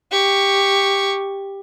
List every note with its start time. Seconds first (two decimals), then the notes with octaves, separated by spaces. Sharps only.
0.12 G4 C#6